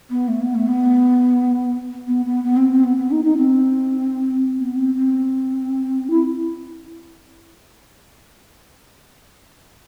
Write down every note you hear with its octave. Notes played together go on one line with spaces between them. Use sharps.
B3
A3
B3
A3
B3
B3
B3
B3
C4
C4
B3
B3
D#4
D#4
C4
B3
C4
C4
E4